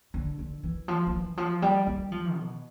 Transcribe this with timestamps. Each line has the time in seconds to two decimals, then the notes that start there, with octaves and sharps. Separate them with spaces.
0.14 D3
0.38 D3
0.63 E3
0.88 F3
1.07 F3
1.13 E3
1.37 F3
1.62 G3
1.87 G3
2.12 F3
2.36 B2